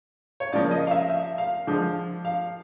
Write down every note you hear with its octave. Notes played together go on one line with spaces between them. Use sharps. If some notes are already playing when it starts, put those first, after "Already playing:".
C#5
C#3 F3 A#3 D5
D#5
F5
E5
E5
F5
D3 F3 G#3
F5